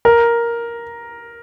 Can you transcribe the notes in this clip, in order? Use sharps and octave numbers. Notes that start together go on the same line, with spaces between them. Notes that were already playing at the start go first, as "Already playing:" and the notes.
A#4